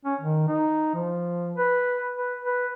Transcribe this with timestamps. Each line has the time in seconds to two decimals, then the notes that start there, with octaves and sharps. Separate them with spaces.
0.05 C#4
0.21 D#3
0.48 D#4
0.95 F3
1.56 B4
2.15 B4
2.45 B4